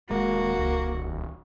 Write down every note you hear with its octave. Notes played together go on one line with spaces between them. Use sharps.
D#1 G#3 A#3 F#4
C#2